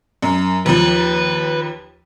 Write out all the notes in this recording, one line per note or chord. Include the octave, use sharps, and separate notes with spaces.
F#2
D#2 F3 B4